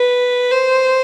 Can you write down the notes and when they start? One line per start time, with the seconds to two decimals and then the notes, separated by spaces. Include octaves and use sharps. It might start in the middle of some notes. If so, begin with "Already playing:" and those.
Already playing: B4
0.51 C5